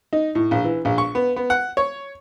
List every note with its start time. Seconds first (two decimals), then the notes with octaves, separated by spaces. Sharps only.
0.13 D#4
0.35 A2
0.51 A#1
0.64 E3
0.85 A#1
0.98 C#6
1.15 B3
1.36 B3
1.50 F#5
1.77 C#5